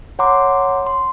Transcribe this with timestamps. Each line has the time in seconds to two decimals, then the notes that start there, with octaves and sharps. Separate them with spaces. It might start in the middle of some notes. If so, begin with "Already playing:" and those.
0.19 C#5 F#5 A#5 C6 D6
0.87 C6